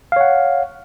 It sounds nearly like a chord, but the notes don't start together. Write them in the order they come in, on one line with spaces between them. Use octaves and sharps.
F5 C#5 F#5